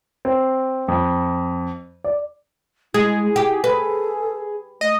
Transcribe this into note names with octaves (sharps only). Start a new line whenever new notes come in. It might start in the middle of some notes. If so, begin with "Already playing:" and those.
C4
F2
D5
G#3 E4 G#4
G4
A4 B4
A3 D#5